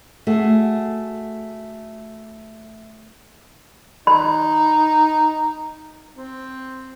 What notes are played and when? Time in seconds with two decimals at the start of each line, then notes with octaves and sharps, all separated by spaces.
0.27 A3 F#4 G#4
4.07 D#4 B5
6.16 C4